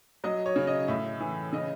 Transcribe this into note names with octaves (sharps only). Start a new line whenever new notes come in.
F#3 D#5
C#5
C#3
D#5
A2 E5
E3
C#3 D#5